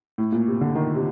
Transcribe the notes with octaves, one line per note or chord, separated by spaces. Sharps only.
A2
A#2
C3
D3
D#3
C3